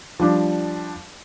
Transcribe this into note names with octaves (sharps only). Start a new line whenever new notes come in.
F3 G3 D4